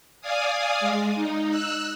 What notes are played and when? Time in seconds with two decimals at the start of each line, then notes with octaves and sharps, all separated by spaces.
0.21 D5 F5 G#5 D#6
0.80 G#3
1.15 D#4
1.50 E6 F#6